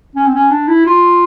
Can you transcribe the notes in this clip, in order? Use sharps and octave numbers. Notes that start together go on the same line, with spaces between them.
C#4
C4
C#4
D4
E4
F4